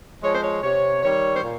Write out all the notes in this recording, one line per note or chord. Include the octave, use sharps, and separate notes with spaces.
F3 G#3 C#5
C5
C#5
C3 C#5
D#3 G3 C#5
C5
A#2